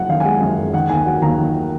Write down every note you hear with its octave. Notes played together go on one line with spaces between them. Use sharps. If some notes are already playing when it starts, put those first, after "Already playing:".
Already playing: F#1 F#2 F#5
D#3 F5
G#5
G#3 F#5
F#2
F#1
D#3 F#5
D#2 G#5
F#3 F#5
D#2 A#5
D#3